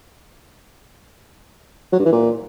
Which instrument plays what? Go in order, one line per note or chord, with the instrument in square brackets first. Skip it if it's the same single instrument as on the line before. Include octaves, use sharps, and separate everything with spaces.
[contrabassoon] F#3
G2
E3
A#2